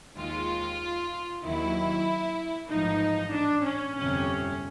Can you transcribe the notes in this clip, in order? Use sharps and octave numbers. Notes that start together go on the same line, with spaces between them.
D#2 D#3 G#3 F4
D#2 D#3 F#3 E4
A1 G#2 F3 D#4
D4
C#4
G1 F2 C3 C#4